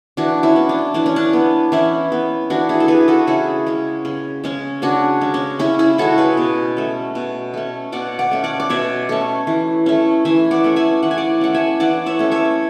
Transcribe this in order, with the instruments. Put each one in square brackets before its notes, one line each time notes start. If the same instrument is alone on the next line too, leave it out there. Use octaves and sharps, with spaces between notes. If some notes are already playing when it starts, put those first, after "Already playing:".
[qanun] E3 D4 F#4
C#4 E4
B3
D4
E3 D4
C#4
D4
B3
E3 C#4 E4
B3
E3 D4 F#4
E4 G#4
A4
B3 G#4 B4
F#4 A4
C#3 E4 G#4
G#3 C#4
C#3
G#3 C#4
C#3 D4 F#4
G#3 C#4
C#4
C#3 C#4 E4
E4 G#4
G#3 C#4 F#4 A4
G#4 B4
B2
A3 C#4
B2
A3 C#4
B2 D5 F#5
D5 F#5
A3 C#4
D5 F#5
D5
B2 C#5 E5
A3 C#4
E3
A3 C#4
E3 E5 G#5
D5 F#5
A3 C#4
E5 G#5
E3 F#5
G#5
D5 F#5
A3 C#4 F#5
E5 G#5
E3 D5 F#5
C#5 E5
A3 C#4
C#5 E5